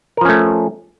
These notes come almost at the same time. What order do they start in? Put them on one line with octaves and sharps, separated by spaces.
A#4 F3 C#4 A3